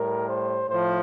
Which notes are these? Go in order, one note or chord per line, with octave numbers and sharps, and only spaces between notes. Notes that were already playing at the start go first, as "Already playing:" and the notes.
Already playing: A2 G3 A#4
C5
A2 F3 C5